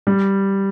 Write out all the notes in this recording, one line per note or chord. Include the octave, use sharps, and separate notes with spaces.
G3